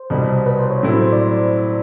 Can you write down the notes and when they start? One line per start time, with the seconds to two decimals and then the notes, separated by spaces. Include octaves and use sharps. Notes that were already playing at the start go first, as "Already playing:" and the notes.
Already playing: C5
0.10 C2 B2 G3
0.46 B4
0.59 C5
0.71 C#5
0.83 A2 F#3 A3 C4 E4
1.02 C5
1.13 D5